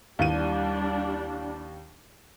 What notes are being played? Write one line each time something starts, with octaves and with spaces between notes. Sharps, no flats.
D#2 E3 G3 D4 D#7